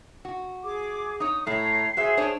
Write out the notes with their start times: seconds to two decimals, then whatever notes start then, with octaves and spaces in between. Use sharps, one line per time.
0.25 F#4
0.63 G#4 D6
1.20 D#4 C#5 D#6
1.47 A2 A3 C#5 A#5 C7
1.97 F#4 G#4 C5 E5
2.17 D4 C5 C#5